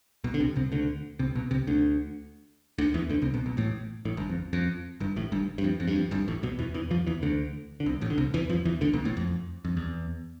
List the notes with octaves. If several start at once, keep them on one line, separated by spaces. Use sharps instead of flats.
B1 B2
D3
C2 C3
C2 C3
D2 D3
C2 C3
B1 B2
C2 C3
D2 D3
D2 D3
E2 E3
D2 D3
C2 C3
B1 B2
B1 B2
A1 A2
A1 A2
G1 G2
F2
F2
G1 G2
A1 A2
G1 G2
G2
F2
F2
G2
F2
G1 G2
A1 A2
B1 B2
E2 E3
E2 E3
F2 F3
E2 E3
D2 D3
D3
C2 C3
A1 A2
D3
C2 C3
E2 E3
F2 F3
E2 E3
D2 D3
B1 B2
A1 A2
F2
F2
E2